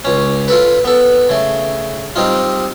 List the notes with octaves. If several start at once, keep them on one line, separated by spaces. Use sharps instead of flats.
C#2 C#4
F4 A4 B4
B3 A4
C#3 A3
G3 C4 D#4 F4